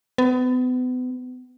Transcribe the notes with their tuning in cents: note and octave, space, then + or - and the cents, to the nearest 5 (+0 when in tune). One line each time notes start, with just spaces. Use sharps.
B3 +35